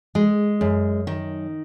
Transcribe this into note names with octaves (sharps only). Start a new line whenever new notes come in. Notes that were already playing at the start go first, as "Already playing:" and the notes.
G#3
F#2
D#3